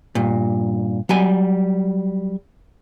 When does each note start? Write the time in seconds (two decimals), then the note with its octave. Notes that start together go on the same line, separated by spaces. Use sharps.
0.15 G2 A#2
1.09 F#3 G3 G#5